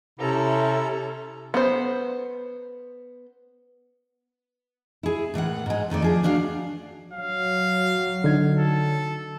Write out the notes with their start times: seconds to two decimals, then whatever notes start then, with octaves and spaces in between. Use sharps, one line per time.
0.19 C3 C#4 E4 A4 A#5
1.54 B3 C5
5.03 E4 G#4
5.34 A2 E3 A#4 F#5
5.66 G#2 G#3
5.90 F2 D#3 A3 D5
6.02 F3 G#4 D5
6.23 A3 A#3 D4 F#4 D5 F5
7.13 F#3 F5
8.24 D3 D#4 G#6
8.58 A4